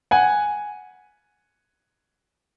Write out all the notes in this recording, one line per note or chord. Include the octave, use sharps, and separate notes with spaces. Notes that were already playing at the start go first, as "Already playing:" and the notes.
F#5 G#5